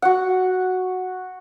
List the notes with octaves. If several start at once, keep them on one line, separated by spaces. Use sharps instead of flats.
F#4 F#5